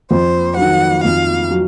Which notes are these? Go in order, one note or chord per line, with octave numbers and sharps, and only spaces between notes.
F2 C5
D#3 F#3 F#5
F2 F5
F#3